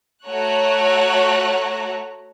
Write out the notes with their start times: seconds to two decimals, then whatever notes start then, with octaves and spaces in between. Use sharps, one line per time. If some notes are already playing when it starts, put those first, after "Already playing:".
0.25 A3 F#4 C#5 A#5 F#6